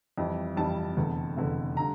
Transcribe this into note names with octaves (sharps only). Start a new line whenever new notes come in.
F2 E3 G3
F2 E3 G3 A5
F1 E2 D3
F1 E2 D3
D3 G3 A#5